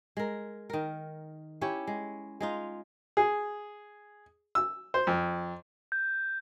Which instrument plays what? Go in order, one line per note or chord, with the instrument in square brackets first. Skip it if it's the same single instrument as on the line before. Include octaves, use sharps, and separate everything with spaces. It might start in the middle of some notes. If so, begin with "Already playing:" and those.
[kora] G#3 A#4
D#3 A#4
C#4 E4 G4 C#5
G#3
G#3 D#4 F4
[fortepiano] G#4
E6
C5
F2
[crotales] G6